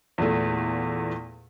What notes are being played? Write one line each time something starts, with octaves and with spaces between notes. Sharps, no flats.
E2 A#2 A3